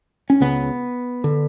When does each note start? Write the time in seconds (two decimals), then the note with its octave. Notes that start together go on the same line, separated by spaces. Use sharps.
0.30 C#4
0.40 C#2 C#3 B3
1.24 D3